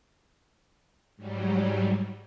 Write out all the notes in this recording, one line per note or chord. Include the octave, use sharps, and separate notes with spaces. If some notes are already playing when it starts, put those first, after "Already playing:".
G#2 F#3 G3